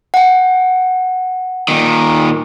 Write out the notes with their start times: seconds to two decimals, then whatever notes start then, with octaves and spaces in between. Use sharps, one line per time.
0.14 F#5 G5
1.68 A#2 D#3